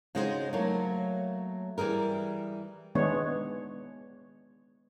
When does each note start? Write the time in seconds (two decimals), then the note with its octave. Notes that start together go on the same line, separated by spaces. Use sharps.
0.15 C#3 G#3 D#4 F#4 G#4 C5
0.53 F#3 A3 A#3 C#5
1.78 E3 G3 G#4 A#4
2.95 D#3 G#3 B3 D4 C#5